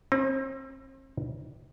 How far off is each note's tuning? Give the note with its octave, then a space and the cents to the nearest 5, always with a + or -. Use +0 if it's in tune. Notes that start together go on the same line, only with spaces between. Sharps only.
C4 +40